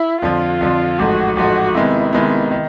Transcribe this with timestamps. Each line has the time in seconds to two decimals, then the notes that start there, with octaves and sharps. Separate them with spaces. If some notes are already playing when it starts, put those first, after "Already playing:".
Already playing: E4
0.22 F2 D3 F3 F4
0.61 F2 D3 F3
0.98 A1 G#2 F3 A3 F#4
1.36 A1 G#2 F3 A3 F#4
1.75 C3 D#3 G#3 B3 E4
2.13 C3 D#3 G#3 B3
2.51 D#3